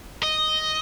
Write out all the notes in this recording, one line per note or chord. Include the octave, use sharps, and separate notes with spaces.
D#5